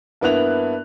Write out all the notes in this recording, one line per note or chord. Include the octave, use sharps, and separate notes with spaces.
G2 A#3 B3 E4 F#6 F7